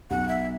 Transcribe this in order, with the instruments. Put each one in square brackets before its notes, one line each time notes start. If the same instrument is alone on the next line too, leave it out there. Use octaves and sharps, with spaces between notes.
[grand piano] B1 [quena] F#5
[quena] E5